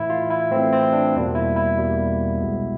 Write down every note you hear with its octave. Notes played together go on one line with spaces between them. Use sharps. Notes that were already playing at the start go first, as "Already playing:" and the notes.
Already playing: A2 E3 A3 E4
F4
E4
A2 E3 A3 C4
C4
D4
E2 B2 G3 A#3
E4
E4
E2 B2 G3 A#3
C2 B2 G#3 B3